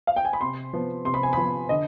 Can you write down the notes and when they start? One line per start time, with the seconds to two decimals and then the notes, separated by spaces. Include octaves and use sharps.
0.07 F5
0.16 G5
0.25 G#5
0.33 B5
0.41 C3 C6
0.73 F3 B3
1.05 C3 C6
1.14 B5
1.23 G#5
1.33 F3 B3 B5
1.69 D3 D#5